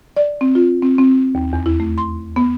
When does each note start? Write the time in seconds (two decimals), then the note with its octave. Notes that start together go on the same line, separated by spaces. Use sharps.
0.16 D5
0.41 C4
0.55 F4
0.82 C4
0.98 C4
1.35 D#2
1.53 E2
1.66 E4
1.80 A3
1.98 C6
2.36 B3